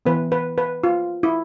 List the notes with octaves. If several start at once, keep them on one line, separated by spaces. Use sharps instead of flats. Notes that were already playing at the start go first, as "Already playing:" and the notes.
E3 B3 B4
B4
B4
F4
E4